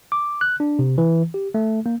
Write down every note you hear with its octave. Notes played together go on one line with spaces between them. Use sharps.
D6
F#6
D4
C3
E3
G4
A3
A#3